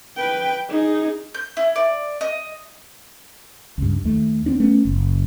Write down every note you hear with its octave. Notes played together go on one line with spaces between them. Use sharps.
B4 G5
D#4 G#4
G6
E4
D5
D#5
C#2 G2
D#2 A3
B3 C4 D4
A3 B3 C#4
F#1